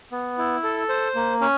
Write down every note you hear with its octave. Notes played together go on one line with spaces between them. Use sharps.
B3
E4
A4
C5
A#3
C#4